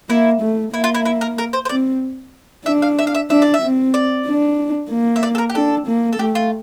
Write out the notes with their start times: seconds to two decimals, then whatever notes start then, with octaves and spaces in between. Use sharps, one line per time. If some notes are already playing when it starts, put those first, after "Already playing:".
0.09 A#3 E4
0.42 A3
0.73 A#3 E4
0.84 F4
0.95 E4
1.05 E4
1.21 A#4
1.38 A#4
1.53 C5
1.65 C5
1.69 C4 D5
2.66 D4 E5
2.82 F5
2.99 E5
3.07 F5
3.15 E5
3.30 D4 E5
3.42 D5
3.54 E5
3.62 C4
3.94 D5
4.27 D4
4.90 A#3
5.16 E5
5.23 D5
5.35 A4
5.38 A#4
5.50 G4
5.55 D4 A4
5.87 A#3
6.13 A4
6.19 A3 G4
6.35 F4